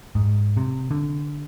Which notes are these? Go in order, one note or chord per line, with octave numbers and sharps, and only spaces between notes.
G#2
C3
D3